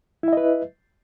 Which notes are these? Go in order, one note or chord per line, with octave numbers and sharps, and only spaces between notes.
E4 B4 D#5 E5